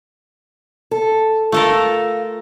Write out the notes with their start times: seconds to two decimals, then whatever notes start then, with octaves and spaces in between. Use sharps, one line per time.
0.91 A4
1.52 A3 F4 A4 A#4